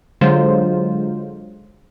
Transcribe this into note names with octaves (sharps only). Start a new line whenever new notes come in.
D3 F#3 G#3 F4 C5